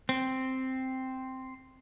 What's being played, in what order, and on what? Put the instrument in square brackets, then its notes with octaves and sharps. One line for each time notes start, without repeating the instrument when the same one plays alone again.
[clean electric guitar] C4